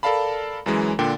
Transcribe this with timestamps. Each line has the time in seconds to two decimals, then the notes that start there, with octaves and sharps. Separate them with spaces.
0.03 A4 A#4 D5 F5 A5 B5
0.66 F#2 E3 G#3
0.99 A#2 D3 D4 G5